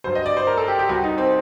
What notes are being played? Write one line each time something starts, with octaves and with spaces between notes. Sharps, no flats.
G2 F#3 C5
D#5
D5
C5
A#4
A4
G4
G4
C2 C3 G3 F#4
D#4
C4